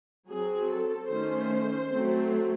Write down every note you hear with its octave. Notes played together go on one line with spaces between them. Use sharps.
F#3 C4 G#4
A4
D#3 A3 C#4 C5
F#3 A3 C4